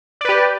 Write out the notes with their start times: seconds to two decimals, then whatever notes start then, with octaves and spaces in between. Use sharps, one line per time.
0.21 D5
0.25 B4
0.29 G4